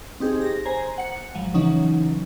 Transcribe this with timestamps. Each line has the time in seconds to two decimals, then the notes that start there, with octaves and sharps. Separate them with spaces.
0.20 C4 D#4 G4 G#4
0.41 A#6
0.65 C5 G#5 A#5
0.98 F#5 C#7
1.34 G#1 F3 F#3
1.54 C#3 E3 F#3 C#4 D#4